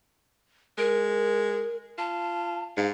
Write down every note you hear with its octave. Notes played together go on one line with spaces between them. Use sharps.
G#3 A#4
F4 A5
G#2 F5